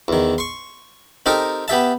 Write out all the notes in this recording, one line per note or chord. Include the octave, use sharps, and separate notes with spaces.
E2 D#3
C6 C#6
C4 D#4 G4 A4 A#4
B3 G4 E5 A5